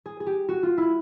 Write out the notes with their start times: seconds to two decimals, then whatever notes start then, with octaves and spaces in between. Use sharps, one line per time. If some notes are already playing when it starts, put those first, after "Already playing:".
0.06 G#4
0.20 G#4
0.27 G4
0.49 F#4
0.63 F4
0.78 E4